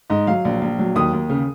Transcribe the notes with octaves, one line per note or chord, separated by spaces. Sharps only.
G#2 D#5
F#3 F5
A#1
A#1
F#3
D#2 D#6
D#2
C#3